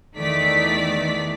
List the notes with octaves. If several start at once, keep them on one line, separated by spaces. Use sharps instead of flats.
E2 D#3 E3 A3 D5 B6